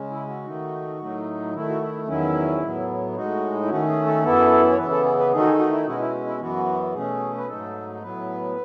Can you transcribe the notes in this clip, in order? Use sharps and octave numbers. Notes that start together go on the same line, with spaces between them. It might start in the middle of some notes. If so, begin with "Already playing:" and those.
Already playing: C#3 G#3 C#4
E4
F#4
D#3 A3 D#4
A2 F#3 A3 D#4
D#3 A3 E4
F#4
E4
E2 D#3 F#3 C#4 E4
A2 F#3 B3
A2 G#3 D#4 F#4
E4
D#3 A3 C#4 F#4
G#4
A4
F#2 E3 B3 E4 A4
C#5
C#3 E3 B3 B4
A4
G#4
B4
D#3 A3 D#4 G#4
F#4
G#4
F#4
E4
B2 G#3 C#4 E4 F#4
E4
E4
F#2 E3 B3 F#4
B2 A3 C#4 G#4
B4
G#2 F#3 A3 D#4 A4
A2 F#3 B3 B4